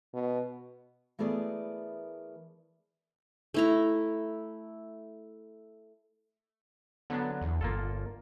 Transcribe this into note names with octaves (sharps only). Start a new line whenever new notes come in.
B2
E3 A3 B3 G#4 A#4 D5
A3 E4 A#5
D3 F#3 B3 D4
E2
G1 A#3 F4 A4